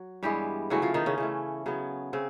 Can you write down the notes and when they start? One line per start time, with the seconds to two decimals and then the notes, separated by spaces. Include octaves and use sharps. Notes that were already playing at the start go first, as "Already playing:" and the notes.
Already playing: F#3
0.23 G2 E3 G3 G#3 B3 G4
0.70 C#3 E3 F#3 A3 F#4
0.82 F3 F4
0.94 D#3 D#4
1.06 C#3 C#4
1.18 C#3 E3 A3
1.66 C#3 F#3 B3
2.13 C#3 C4